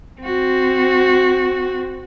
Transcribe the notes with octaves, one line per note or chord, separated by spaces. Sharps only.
C4 F#4